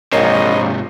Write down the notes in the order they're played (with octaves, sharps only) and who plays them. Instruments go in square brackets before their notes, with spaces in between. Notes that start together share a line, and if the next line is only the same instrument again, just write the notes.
[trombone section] A#1 [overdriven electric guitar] G#2 C3 [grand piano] A#4 C#5 C7 [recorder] D#5